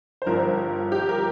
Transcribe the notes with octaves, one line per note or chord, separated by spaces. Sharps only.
C5
G1 G2 F3 A#4
G4
A#4